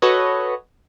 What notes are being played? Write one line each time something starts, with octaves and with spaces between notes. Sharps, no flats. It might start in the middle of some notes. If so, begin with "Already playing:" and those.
F#4 A4 B4 C#5 D#5